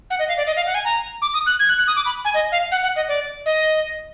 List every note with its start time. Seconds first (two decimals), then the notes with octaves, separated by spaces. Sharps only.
0.10 F#5
0.19 D#5
0.28 F5
0.37 D5
0.47 D#5
0.56 F5
0.66 F#5
0.75 G#5
0.85 A#5
1.22 D6
1.34 D#6
1.47 F#6
1.60 G#6
1.68 F#6
1.78 F#6
1.87 D#6
1.96 D6
2.06 B5
2.25 G#5
2.34 D#5
2.52 F5
2.72 F#5
2.83 F#5
2.96 D#5
3.08 D5
3.46 D#5